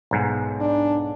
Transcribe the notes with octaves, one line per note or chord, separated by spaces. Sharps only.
B1 G#2
D4